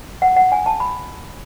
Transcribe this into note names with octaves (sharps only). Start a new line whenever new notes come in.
F#5
F#5
G#5
A5
B5